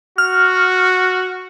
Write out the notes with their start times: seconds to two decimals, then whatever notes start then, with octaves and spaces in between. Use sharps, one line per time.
0.18 F#4 F6